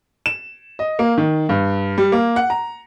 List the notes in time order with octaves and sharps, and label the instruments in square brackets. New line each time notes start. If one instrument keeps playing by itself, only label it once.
[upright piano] E7
D#5
A#3
D#3
G2
G3
A#3
F#5
A#5